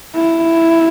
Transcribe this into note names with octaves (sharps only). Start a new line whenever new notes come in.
E4